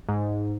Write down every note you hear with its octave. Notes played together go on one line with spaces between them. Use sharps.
G#2